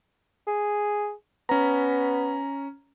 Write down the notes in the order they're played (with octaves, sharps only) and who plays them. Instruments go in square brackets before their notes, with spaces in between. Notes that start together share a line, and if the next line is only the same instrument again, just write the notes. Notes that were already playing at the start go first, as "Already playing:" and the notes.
[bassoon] G#4
[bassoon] B3 [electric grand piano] C#4 A#5